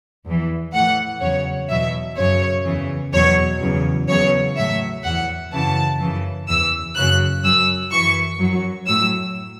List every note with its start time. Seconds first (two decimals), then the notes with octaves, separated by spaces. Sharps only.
0.26 E2 E3
0.73 A2 E3 F#5
1.21 E2 C#3 F#3 C#5
1.69 E2 B2 F#3 E5
2.17 F#2 C#3 F#3 C#5
2.65 E2 C#3 E3
3.13 E2 B2 F#3 C#5
3.61 E2 C#3 F#3
4.08 E2 C#3 F#3 C#5
4.56 A2 F#3 E5
5.04 E2 E3 F#5
5.52 F#2 C#3 E3 A5
6.00 F#2 C#3 E3
6.47 E2 E3 E6
6.96 F#2 C#3 F#3 F#6
7.43 F#2 F#3 E6
7.92 F#2 E3 C#6
8.39 F#2 F#3
8.87 A2 F#3 E6